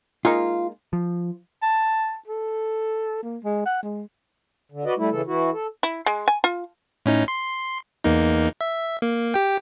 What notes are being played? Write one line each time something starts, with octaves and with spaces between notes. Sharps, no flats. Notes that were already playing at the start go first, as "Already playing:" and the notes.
G#3 A#3 D#4 F4
F3
A5
A4
A#3
G#3
F#5
G#3
D3
F#4 B4 D5 D#5
G3 A3 E4
C#3 E3 A4
E3 E4 F#4
A4
E4
G#3
G#5
F4
A2 C#4 D#4
C6
E2 A#3 D#4
E5
A#3
G4 G5